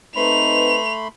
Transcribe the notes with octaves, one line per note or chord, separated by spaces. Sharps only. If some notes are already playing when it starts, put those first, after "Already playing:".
A3 C4 D#4 B4 B5 C6 F7